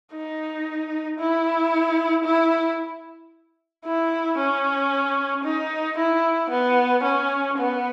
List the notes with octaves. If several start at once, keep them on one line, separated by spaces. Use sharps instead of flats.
D#4
E4
E4
E4
C#4
D#4
E4
B3
C#4
B3